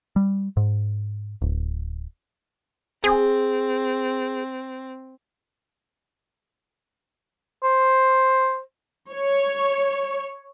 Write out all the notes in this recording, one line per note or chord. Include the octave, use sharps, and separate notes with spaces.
G3
G#2
D1
C4 G#4
C5
C#5